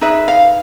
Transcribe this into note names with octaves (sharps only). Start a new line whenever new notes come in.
D#4 G#4 B4 E5
F5